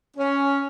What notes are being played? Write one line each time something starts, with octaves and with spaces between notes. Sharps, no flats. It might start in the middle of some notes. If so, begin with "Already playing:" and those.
C#4